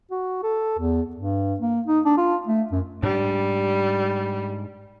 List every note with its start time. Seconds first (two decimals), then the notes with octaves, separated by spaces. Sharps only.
0.11 F#4
0.43 A4
0.79 E2
1.16 G2
1.60 A#3
1.87 D#4
2.06 D4
2.17 F4
2.47 A3
2.72 F#2
3.03 G#2 G3 D4